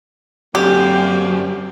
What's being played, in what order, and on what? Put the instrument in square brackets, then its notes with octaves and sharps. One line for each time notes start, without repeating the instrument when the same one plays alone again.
[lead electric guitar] F#2 [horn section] D3 A#3 C4 [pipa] G4